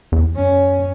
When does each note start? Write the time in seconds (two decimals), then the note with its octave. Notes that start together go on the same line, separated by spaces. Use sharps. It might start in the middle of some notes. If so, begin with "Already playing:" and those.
0.12 E2
0.36 F#2 C#4